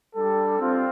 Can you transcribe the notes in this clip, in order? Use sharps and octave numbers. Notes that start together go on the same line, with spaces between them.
G3 D4 G4 A4
C4 F4